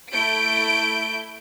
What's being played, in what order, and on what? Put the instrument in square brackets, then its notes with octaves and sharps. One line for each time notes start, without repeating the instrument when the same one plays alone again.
[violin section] A3 E4 G6 D7